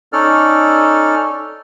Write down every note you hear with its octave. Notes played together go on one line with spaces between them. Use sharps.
C#4 D#4 A4 D5 F6